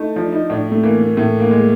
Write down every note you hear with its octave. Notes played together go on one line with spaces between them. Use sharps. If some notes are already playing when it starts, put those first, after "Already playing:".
Already playing: A3 D#4 E4
F3 D4
D#4
A2 D4
A3
E3 A#3
A#3
A2 A3
A#3
G#3